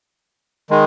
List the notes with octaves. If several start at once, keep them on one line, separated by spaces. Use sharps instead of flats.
D#3 G#3